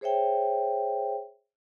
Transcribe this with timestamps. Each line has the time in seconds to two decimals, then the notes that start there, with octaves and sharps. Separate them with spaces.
0.01 G#4 C5 C#5 E5 G5